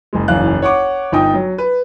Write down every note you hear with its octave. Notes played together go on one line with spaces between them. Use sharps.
F#1 G#3
F#1 B1 E2 C#4 F5 F#6
C#5 F#5 C#6 D6
G1 D#4 F4 G5 D#6
F#3
B4